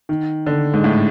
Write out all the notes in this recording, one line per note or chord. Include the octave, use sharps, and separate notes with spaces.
D#3
D3
G#2
A2